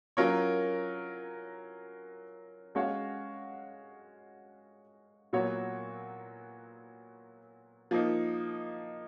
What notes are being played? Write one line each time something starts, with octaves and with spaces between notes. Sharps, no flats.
F#3 C#4 F4 A#4 C#5
G#3 C#4 F#4 C#5 F5
A#2 F#3 B3 F#4 C#5
F3 A#3 D#4